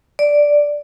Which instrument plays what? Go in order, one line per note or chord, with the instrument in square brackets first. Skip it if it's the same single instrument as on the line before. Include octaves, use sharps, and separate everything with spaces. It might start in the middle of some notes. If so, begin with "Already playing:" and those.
[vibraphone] D5